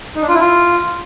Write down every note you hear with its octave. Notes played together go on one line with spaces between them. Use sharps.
D#4
D4
F4
E4
F4